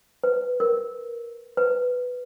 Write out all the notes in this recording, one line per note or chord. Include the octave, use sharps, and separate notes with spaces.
B4
A#4
B4